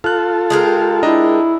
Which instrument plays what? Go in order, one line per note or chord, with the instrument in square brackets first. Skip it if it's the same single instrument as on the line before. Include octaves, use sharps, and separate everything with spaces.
[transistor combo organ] F4 A4 [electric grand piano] F6 F#6
[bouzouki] G#3 G4 A#4
[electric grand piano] D4 D#5 A#5 [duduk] E4